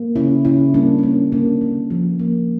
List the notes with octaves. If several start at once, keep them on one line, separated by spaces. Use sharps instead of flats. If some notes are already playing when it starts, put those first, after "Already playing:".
Already playing: A#3
C#3 C#4 E4
C#3 C#4 E4
G3 A#3 D4
D4
A#3 C#4
D3 A#3 D4
D3
F3
A#3